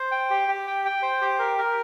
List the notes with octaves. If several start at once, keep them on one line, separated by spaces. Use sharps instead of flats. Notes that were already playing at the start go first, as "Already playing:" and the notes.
Already playing: C5
G5
G4
G4
G5
G5
C5
G4
A#4
A#4